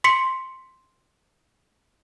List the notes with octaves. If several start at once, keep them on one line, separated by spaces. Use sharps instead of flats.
C6 B6 C#7